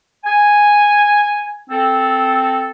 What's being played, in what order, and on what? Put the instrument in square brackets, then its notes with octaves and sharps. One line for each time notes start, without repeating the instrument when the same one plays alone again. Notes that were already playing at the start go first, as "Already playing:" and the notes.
[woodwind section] G#5
C4 A4